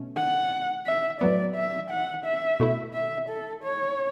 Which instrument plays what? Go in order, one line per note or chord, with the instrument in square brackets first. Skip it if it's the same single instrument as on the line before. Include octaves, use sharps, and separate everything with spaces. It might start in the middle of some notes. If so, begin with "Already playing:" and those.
Already playing: [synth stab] B2 A3 C#4
[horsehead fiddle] F#5
E5
[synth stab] A2 F#3 B3 [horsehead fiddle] D5
[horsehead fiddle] E5
F#5
E5
[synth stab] B2 A3 E4
[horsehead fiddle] E5
A4
C#5